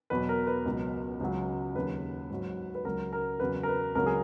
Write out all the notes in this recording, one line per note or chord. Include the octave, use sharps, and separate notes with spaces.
E2 B2 F#3 B4
A#4
B4
C#2 B2 F#3
C#2 C#3 F#3
D#2 C#3 F#3 B4
G#2 F#3
B4
C#2 C#3 F#3 A#4
A#4
E2 C#3 F#3 B4
A#4
B4
C#2 C#3 F#3 A#4
G#4